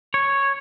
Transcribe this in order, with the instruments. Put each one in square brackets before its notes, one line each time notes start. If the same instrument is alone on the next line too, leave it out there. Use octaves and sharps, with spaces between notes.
[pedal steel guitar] C#5